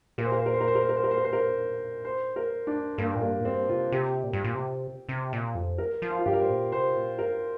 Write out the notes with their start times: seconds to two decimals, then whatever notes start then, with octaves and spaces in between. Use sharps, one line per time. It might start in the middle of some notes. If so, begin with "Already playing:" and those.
0.18 A#2 A#4
0.25 C5
0.32 A#4
0.39 C5
0.46 A#4
0.54 C5
0.61 A#4
0.67 C5
0.75 A#4
0.82 C5
0.89 A#4
0.97 C5
1.04 A#4
1.11 C5
1.17 A#4
1.24 C5
1.33 A#4
2.05 C5
2.36 A#4
2.67 D4
2.88 F2
2.98 G2 A#3
3.15 A#2
3.21 G2 A#3
3.40 A#2
3.45 G2 C4
3.69 C3 F4
3.92 C3 G4
4.23 A#2
4.33 G2
4.44 A#2
4.55 C3
5.09 C3
5.33 A#2
5.55 F2
5.78 A#4
6.02 F3
6.10 F5
6.19 F4
6.26 G2 G4
6.33 A#4
6.41 C5
6.49 A#2
6.72 C3 C5
6.96 A#2
7.19 G2 A#4